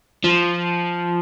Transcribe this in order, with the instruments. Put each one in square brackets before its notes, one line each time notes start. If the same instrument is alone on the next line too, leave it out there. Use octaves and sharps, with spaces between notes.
[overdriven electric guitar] F3